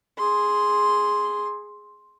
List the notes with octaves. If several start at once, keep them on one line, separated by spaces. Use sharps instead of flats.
G#4 C6